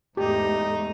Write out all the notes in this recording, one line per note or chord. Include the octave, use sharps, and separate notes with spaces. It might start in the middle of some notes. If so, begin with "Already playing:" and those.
E2 G#2 A3 D#4 G4